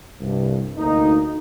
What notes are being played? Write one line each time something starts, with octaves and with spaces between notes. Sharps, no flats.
C2 G2
D2 A#3 D#4